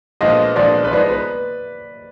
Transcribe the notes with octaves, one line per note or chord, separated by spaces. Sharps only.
A#2 F3 G#3 B3 D4 D#5
A#2 F3 G#3 B3 D4 D5
B4
F3 G#3 B3 D#4 D5
B4